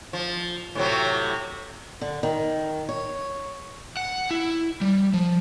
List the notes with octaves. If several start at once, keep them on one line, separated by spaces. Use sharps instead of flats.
F3
A2 C3 F#3
D3
D#3
C#5
F#5
E4
G3
F3